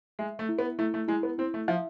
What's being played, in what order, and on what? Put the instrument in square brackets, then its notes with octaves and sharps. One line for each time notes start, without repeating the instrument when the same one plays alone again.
[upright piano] G#3 [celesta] E5
[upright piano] A3
[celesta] E4
[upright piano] B3
[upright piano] A3 [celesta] E4
[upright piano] A3
[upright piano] G#3 [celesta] E4
[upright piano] B3
[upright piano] C4 [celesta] E4
[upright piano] A3
[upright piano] F3 [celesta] E5